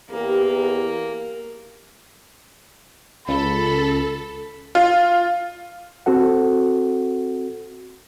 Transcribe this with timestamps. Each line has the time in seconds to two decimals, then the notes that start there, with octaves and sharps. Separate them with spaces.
0.10 E2 A#3 G4
3.28 C#2 A4 B5
4.75 F4
6.06 C4 F#4 A4 F#5